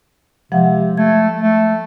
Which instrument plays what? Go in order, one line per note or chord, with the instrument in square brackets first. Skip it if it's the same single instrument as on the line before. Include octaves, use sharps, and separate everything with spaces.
[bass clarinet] C3 [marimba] F3 G#3 F#5
[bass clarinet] A3 [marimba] G#6
[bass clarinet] A3